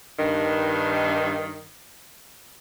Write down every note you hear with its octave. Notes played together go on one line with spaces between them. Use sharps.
G2 D#3